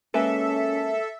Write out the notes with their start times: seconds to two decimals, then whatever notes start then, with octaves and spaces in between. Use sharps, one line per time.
0.14 G#3 A#3 C#4 A4 B4 E5